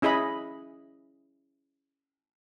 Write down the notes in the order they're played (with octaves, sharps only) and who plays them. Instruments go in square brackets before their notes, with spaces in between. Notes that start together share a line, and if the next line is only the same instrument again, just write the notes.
[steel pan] C#4 E4 G#4 D#5 B5